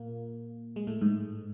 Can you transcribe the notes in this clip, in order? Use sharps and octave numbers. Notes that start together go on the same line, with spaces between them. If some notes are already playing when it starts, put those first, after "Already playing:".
Already playing: A#2 A#3
G#3
A2 A3
G#2 G#3